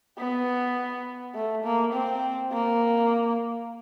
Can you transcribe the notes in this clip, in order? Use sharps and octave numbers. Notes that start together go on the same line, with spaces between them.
B3
A3
A#3
C4
A#3